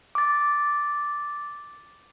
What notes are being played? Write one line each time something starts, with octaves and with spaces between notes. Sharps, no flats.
D6 A6